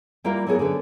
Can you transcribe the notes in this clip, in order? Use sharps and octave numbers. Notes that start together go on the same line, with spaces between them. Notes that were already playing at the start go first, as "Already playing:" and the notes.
G3 A#3 E4 F4 A#4 E5
F#3 A3 B3 G#4 A#4
D3 C#4 G#4 B4